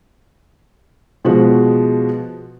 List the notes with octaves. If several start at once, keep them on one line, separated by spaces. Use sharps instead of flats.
B2 F3 G#3 F#4